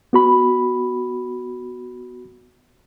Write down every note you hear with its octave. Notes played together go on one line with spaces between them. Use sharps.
B3 F#4 B5